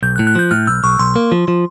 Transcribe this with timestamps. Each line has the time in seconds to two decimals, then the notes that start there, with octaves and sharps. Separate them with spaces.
0.03 B1 G6
0.16 F#6
0.19 A2
0.27 F#6
0.35 F3 G6
0.51 A2 F6
0.67 B1 E6
0.84 B1 C#6
0.99 B1 C6
1.16 A#3
1.32 F3
1.48 F3